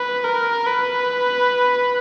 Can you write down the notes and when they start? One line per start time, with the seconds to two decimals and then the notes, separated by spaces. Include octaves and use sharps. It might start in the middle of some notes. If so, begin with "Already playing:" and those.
Already playing: B4
0.24 A#4
0.66 B4